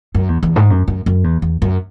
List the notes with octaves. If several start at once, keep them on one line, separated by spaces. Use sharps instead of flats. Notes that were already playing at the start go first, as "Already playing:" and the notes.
F#2
E2
E2
G#2
F#2
F#2
F#2
E2
E2
F#2